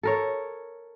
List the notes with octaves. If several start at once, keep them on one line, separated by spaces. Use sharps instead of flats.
A4 A#4 C#5